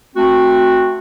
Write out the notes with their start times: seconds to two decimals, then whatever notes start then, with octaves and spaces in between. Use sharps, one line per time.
0.16 A3 C4 F#4